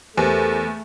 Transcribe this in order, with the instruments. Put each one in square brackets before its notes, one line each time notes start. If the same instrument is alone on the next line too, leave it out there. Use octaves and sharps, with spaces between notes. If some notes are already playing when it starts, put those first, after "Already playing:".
[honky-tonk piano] E2 [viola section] A3 [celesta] G4 A#4 C5